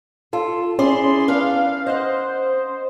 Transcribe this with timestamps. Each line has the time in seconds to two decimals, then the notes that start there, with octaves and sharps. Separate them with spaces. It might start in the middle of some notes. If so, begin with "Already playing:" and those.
0.33 F4 A4
0.79 C#4 E4 G#4 D5 C6
1.28 D4 B4 F5
1.87 C5 D#5 F#5